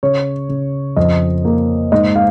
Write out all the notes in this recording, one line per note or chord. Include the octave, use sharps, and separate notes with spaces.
C#3 C#5
C#3
F2 D#5
A#3
G#2 D#5
F5